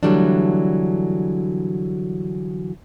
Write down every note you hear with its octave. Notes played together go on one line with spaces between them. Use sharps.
D3 E3 F#3 G3 A3 D4